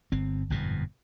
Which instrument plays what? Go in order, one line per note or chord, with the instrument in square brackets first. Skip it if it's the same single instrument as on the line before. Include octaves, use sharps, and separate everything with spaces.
[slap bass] G1 C4
G1 F2 G#2 B2